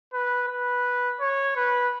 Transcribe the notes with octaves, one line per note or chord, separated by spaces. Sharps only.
B4
B4
C#5
B4